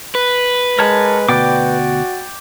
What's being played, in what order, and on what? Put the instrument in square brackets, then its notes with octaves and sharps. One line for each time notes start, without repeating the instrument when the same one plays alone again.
[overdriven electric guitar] B4
[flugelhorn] G#3 [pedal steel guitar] A#4 C#5 A5
[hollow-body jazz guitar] D2 B2 [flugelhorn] F#4 [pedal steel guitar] D5 G5 D6